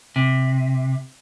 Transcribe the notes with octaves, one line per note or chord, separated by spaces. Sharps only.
C3